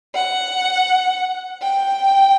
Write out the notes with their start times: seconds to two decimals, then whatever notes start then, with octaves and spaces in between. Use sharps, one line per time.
0.15 F#5
1.62 G5